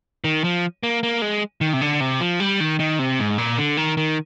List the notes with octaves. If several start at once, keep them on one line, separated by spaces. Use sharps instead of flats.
D#3
F3
A#3
A#3
G#3
D#3
C3
D3
C3
F3
G3
D#3
D#3
C3
G#2
A#2
D3
D#3
D#3